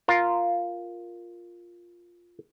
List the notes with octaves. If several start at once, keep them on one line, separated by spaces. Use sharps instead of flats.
F4 A#4